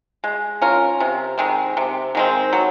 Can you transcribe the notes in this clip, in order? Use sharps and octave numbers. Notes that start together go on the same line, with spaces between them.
G#3
C#4 F4 A#4
C3
D#3 G#3 C4
C3
D#3 G#3 C4
F#3